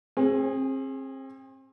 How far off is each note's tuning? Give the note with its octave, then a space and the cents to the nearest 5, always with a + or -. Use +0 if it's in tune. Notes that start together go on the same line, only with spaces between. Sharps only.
C4 +35 G#4 -10